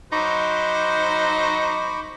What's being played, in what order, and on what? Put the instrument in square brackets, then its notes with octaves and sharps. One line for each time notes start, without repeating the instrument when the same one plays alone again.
[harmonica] F#3 C5 [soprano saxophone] D#4 [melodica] B5 C#6 D6